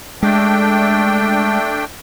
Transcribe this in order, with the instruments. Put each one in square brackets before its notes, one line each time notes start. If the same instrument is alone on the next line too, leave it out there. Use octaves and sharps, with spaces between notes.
[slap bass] G#3 [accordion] A3 D4 G5